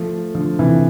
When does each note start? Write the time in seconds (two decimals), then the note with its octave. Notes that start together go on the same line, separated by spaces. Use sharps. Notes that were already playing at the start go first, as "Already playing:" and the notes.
Already playing: F3 A3
0.34 D3 F3
0.59 C3 E3